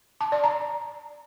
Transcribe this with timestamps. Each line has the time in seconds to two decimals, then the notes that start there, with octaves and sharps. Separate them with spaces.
0.21 A5
0.32 D5
0.44 A#5